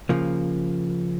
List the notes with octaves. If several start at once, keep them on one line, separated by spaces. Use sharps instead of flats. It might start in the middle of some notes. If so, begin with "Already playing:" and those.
C#3 F3 A#3